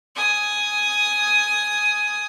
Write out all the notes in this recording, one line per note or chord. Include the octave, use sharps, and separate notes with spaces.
G#5 D#6